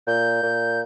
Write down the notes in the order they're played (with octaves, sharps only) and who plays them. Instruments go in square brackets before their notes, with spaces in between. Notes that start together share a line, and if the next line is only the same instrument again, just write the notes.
[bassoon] A#2 [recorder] G6
[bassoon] A#2